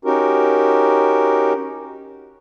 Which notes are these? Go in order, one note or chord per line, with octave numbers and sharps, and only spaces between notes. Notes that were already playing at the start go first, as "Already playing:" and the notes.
C#4 D#4 F#4 G4 A#4